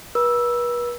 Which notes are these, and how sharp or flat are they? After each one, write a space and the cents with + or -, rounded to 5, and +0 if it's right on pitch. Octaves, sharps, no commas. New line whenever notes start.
B4 -40 E6 +0